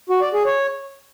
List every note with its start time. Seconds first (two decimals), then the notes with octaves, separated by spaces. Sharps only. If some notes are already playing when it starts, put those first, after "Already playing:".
0.09 F#4
0.21 D5
0.33 G#4
0.45 C#5